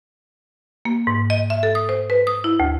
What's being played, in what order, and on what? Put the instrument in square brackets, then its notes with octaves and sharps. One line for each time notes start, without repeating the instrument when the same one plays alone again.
[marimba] A#3
G#2
D#5
E5
A4
D#6
C5
B4
D#6
E4
D2